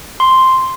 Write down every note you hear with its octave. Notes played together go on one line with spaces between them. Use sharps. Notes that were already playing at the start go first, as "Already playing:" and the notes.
C6